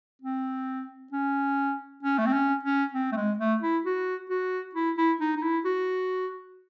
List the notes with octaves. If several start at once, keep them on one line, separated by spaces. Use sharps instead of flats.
C4
C#4
C#4
A3
C4
C#4
C#4
C4
A3
G#3
A3
E4
F#4
F#4
E4
E4
D#4
D#4
E4
F#4